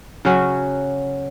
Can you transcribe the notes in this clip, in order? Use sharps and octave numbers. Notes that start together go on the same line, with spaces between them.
C#3 F#3 C#4 F#4